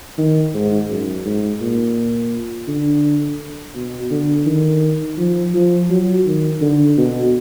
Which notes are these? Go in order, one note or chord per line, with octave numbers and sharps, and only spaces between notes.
D#3
G#2
F#2
G#2
A#2
D3
B2
D3
D#3
F3
F3
F#3
D#3
D3
B2